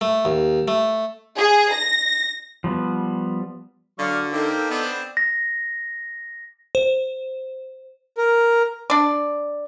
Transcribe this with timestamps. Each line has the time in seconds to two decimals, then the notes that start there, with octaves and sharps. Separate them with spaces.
0.01 A3
0.25 D#2
0.68 A3
1.38 G#4
1.71 A#6
2.64 F3 G3 B3
3.99 D3 F#3 D5 F5 C#6
4.33 A#3 C4 D#4 G4 A4
4.71 B3 C4 D4
5.17 A#6
6.75 C5
8.17 A#4
8.90 D4 D5